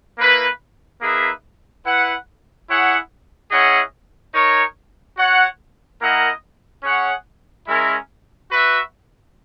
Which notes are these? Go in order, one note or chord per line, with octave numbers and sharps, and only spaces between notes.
A#3 E4 B4
A#3 D#4 G#4 B4 E5
E4 B4 F#5
E4 G#4 C#5 F#5
C#4 E4 G#4 D#5 F#5
D#4 A#4 C#5
F#4 C#5 F#5
A#3 E4 A#4 D#5 F#5
C#4 G#4 C#5 F#5
G#3 C#4 E4 A#4
F#4 B4 E5